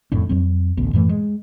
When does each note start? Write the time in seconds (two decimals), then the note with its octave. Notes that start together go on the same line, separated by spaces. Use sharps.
0.12 D#1 F2 A2 D4
0.29 F2 F#3 C4
0.77 A1 D2 B3
0.93 F#2 A2 E3 A3
1.09 G#3